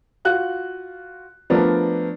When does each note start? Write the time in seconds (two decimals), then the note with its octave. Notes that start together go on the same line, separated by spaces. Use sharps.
0.25 F4 F#4 F#6
1.50 F3 A3 B3 D4 A#4 D5